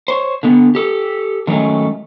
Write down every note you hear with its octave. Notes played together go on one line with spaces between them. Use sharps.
C5 C#5
D3 B3
G4 A4
D3 D#3 F#3 G#3 A3 C#4